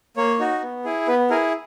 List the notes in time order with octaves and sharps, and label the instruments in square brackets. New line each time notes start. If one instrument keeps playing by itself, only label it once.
[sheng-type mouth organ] A#3 C#5
D#4 F#4
B3
E4 G#4
B3 B4
E4 G#4 A#4